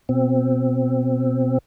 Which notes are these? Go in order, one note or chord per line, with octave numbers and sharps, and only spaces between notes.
B2 C4